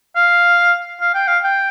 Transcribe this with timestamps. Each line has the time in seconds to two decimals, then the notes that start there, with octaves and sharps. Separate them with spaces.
0.16 F5
1.01 F5
1.14 G5
1.28 F5
1.44 G5